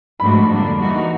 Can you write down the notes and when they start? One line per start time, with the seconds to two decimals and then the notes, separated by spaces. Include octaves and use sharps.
0.19 G#2 F3 A3 D4 F#4 B5
0.49 F2 D3 G3 A#3 D4
0.77 E3 G3 A#3 D#4 F#4